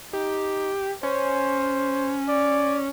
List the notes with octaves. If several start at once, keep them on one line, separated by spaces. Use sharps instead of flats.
D#4 G4
C#4 C5
D5